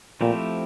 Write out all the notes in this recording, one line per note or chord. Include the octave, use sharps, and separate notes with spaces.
A#2 F3 A3 C4 E4 G4